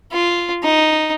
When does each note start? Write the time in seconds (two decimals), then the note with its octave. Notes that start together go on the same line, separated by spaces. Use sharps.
0.12 F4
0.63 D#4